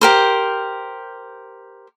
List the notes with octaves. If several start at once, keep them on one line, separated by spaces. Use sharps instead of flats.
G4 A#4 C5